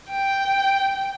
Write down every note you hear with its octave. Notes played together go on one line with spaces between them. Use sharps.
G5